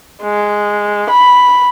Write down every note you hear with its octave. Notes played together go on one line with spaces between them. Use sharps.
G#3
B5